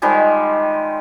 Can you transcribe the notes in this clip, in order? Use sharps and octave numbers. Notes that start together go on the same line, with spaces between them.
D#3 F3 G3 G#3